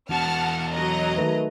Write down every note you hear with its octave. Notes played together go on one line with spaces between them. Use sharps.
E2 F#4 F#5 A5 F6
F#3 D#5 A#5
D#3 A3 B4